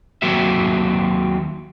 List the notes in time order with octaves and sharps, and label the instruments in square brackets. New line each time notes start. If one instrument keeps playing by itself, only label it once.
[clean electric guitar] D#2 F#3 A#3 C4 F#4 E5